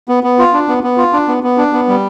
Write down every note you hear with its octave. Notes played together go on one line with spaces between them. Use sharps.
B3
B3
F4
D4
B3
B3
F4
D4
B3
B3
D4
B3
G3